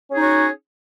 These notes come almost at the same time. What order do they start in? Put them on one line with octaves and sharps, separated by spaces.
C#4 G#4 D#4 C#5 F#4